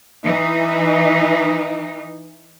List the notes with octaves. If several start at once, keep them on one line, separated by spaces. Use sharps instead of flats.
E3 D#4